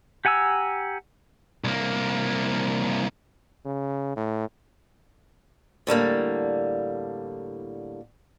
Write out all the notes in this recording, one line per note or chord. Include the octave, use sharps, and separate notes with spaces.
G4 F#5 G#5 A#5 E6
C2 A#3
C#3
A2
A2 D3 G3 A#3